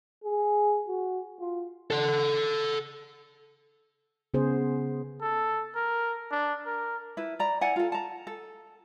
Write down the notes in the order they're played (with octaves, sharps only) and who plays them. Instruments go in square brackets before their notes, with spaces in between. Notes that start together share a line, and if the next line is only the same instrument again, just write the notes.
[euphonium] G#4
F#4
F4
[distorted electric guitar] A4 F#5
[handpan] C#3 B3 G#4 C5
[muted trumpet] A4
A#4
D4
A#4
[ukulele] E4 B4
D5 A#5 B5
E4 D5 F#5 G#5
F4 A4
A5 A#5
A4